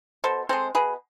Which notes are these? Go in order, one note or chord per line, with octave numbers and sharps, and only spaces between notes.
B2 A4 C5
G#3 C4 A4 C5
B2 G#4 B4